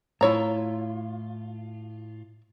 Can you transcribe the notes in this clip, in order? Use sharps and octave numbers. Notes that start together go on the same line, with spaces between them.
A2 E4 F4 C#5 A#5